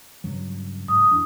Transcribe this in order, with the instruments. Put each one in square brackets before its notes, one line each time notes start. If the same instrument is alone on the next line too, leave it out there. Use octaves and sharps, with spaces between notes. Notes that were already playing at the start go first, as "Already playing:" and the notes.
[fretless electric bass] G2 C#3 F#3
[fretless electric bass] G#2 [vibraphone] D#6
[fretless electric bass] E2 E3 D4